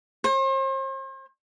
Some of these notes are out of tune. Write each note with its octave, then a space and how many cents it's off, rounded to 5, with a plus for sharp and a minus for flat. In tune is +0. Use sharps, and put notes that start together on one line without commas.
C5 +40